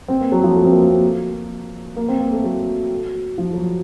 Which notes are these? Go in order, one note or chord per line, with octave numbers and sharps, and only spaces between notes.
C4
A#3
F#3
F3
A3
C4
A#3
C4
A#3
A#3
C4
A#3
A3
F#3
F3
F#3